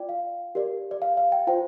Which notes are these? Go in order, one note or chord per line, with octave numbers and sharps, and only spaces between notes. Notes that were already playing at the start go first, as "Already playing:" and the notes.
Already playing: F4 D5 G5
F5
G4 A#4 D5
D5
F5
F5
G5
F4 C5 G5